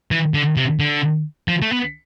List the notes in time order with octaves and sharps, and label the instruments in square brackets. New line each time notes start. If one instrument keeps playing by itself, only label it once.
[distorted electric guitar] E3
D3
C3
D3
F3
A3
B3